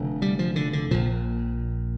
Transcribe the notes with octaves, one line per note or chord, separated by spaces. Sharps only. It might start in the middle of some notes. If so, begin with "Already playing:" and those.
Already playing: F1 F2 D3
G3
F3
D3
D3
A#1 A#2 F3